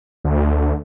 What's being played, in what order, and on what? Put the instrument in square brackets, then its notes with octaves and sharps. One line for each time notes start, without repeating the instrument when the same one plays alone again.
[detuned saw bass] D2